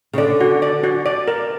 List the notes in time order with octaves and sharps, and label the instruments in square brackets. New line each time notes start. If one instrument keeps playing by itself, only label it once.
[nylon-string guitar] C#3
[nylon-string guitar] D3 [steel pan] D5
[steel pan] F#4
D5
F#4
D5
A#4